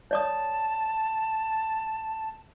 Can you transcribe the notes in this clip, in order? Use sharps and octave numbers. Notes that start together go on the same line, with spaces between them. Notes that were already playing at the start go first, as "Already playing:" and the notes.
C#5 D5 A5 D#6